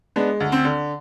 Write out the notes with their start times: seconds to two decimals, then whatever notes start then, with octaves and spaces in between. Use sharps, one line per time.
0.16 G#3 B3 D4
0.40 D2
0.52 C4
0.65 D3